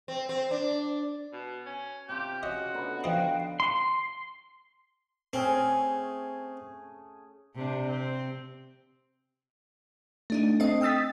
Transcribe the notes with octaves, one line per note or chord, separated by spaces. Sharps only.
C4
C4
D4
B2
C#4
C3 F4 G4
C#3 F#4 D#5
D3 B3 D#4
F3 D#5 F5 G5
C6
A3 C4 C#4 G#4
C3 D4
C4
A3 D4 D#4
C4 A4 D#5
G5 D#6 E6 A6 B6